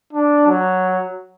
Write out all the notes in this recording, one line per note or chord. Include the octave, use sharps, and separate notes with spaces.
D4
F#3